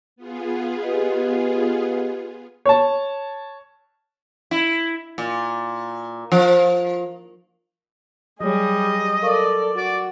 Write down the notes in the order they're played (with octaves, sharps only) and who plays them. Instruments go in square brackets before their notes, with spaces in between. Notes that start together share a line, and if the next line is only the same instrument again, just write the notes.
[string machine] B3 F4 G#4
[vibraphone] G4 B4 D#5
[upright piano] C#5 A5
[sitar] E4
A#2
F3
[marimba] F#3 C#5 [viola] G3 G#4 [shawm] D#5
[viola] A4 D5 [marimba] A#4 F5 C#6
[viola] F#4 [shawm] D5